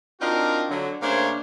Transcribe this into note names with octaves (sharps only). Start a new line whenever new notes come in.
C4 D4 D#4 F4 F#4 A#4
D3 F#3
C#3 A3 A#3 D4 C5 C#5